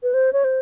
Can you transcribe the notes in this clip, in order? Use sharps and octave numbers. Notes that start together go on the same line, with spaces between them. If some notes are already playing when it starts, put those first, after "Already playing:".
B4
C5
C#5
C5